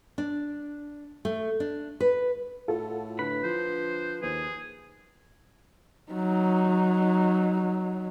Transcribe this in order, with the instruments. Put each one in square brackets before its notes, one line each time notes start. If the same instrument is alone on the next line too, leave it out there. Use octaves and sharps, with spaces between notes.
[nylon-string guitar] D4
A3
D4
B4
[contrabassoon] A2 [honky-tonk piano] F4 F#4 A4
[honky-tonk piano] D3 [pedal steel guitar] B4 B5
[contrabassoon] F3 [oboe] C5
[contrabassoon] D#2 [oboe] G#4 [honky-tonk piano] C5
[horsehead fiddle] F#3 D#4